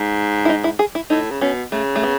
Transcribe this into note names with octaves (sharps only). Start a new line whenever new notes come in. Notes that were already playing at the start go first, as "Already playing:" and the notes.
Already playing: G#2
E4
D#4
E4
G#4
E4
A2 D#4
C#3
B2 C#4
C#3 A3
A3
B3